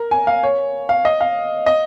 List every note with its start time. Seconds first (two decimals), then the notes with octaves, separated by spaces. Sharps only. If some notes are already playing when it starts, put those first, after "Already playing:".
Already playing: A#4
0.11 G#5
0.27 F5
0.43 C#5
0.89 F5
1.05 D#5
1.21 F5
1.66 D#5